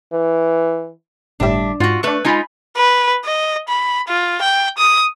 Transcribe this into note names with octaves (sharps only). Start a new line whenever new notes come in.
E3
G1 A2 G3 D4 E5
G#2 F4 F#4
A3 D4 B4 C#6
G#3 D#4 F4 G#5 B5
B4
D#5
B5
F4
G5
D#6